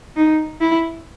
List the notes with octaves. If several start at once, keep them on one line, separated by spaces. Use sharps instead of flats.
D#4
E4